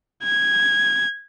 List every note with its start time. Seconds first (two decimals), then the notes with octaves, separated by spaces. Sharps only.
0.24 G#6